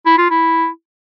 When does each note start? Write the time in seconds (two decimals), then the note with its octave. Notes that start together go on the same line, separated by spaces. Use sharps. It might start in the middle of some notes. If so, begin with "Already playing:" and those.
0.06 E4
0.18 F4
0.30 E4